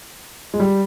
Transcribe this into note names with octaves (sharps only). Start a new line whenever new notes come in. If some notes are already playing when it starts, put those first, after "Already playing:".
G#3
G3